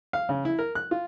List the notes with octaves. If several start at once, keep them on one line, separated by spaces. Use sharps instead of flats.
F5
C#3
E4
A#4
F#6
F4